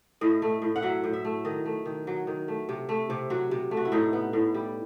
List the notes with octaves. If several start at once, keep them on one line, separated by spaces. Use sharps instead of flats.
A2 D#5
A3
A2
F#5
F#3 E5
A2
E5
A3
D#3 D#5
A3
D#3
F#3
D#3
A3
C3
A3
C3
F#3 F#4
C3
A3
F#4
E4
A2 D#4
B3
A2
G3